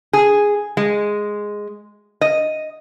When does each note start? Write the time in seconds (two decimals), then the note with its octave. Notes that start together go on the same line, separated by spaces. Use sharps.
0.13 G#4
0.77 G#3
2.21 D#5